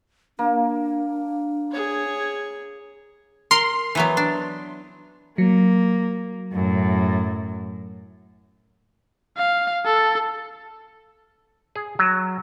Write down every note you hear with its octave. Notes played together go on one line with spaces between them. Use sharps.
A#3 D4
G#4 C#5
A#4 C6
E3 F#3 B3
D4
F#3 A#3
F#2 A2
F5
A4
G#4
F#3